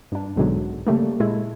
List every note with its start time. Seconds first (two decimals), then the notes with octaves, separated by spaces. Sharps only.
0.12 G2 D4
0.36 B1 G#2 B2 D3 F#3
0.87 C#3 G3 A3 A#3
1.20 A#2 G#3 A3 E4